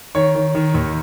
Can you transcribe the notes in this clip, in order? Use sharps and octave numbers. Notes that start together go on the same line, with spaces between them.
D#3 C#5
D#3
D#3
D#2